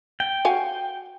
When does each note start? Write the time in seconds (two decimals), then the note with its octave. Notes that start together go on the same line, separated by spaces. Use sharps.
0.20 G5
0.45 F#4 F5 G#5